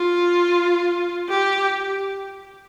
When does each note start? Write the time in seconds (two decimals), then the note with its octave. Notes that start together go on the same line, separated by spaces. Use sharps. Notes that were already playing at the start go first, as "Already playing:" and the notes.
Already playing: F4
1.29 G4